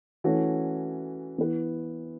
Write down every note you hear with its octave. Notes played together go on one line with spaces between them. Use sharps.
E3 A3 C#4 F#4
E3 B3 E4 B4